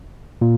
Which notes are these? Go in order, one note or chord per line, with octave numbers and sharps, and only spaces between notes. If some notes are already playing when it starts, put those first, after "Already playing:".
A#2